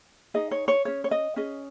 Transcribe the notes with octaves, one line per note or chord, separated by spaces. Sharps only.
D#4 G#4 D#5
C#5
C#5
C#4 G#4 C#5
C#5
D#5
C#4 G#4 D#5